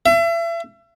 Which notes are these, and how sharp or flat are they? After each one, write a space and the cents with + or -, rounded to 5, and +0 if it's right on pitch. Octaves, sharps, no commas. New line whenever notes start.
E5 +35